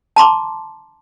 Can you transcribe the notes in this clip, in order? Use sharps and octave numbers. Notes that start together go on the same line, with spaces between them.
A5 A#5 C6 D6